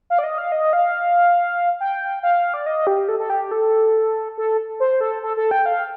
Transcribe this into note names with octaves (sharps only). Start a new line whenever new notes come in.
F5
D5
D#5
F5
D#5
F5
G5
F5
D5
D#5
G4
A4
A4
G4
A4
A4
C5
A4
A4
A4
G5
F5